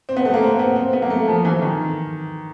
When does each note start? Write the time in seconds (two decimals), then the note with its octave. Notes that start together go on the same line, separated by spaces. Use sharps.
0.09 C4
0.17 B3
0.25 A3
0.34 A#3
0.43 C4
0.59 B3
0.76 C4
0.93 B3
1.02 A#3
1.10 A3
1.28 F3
1.45 E3
1.62 D#3